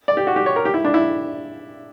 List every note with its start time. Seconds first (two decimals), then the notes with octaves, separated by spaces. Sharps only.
0.08 D5
0.17 G4
0.27 F#4
0.36 G4
0.46 C#5
0.56 A#4
0.65 G4
0.74 E4
0.85 D4
0.94 E4